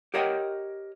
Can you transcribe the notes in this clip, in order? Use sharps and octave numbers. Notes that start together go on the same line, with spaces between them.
G4 A#4 C#5 D#5 F#5 G5